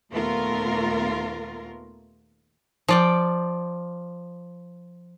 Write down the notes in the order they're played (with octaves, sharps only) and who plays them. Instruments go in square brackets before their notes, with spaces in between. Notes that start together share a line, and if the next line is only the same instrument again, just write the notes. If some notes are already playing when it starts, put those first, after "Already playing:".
[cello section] D#2 A#2 A3 B3 F4 A#4
[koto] F3 D5 G5